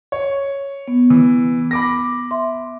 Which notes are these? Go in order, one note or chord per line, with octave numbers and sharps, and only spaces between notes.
C#5
B3
E3
B5 D6 A#6
E5 C6